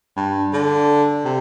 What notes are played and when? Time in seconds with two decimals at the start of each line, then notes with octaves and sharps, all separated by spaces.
0.17 G2
0.53 D3
1.25 C3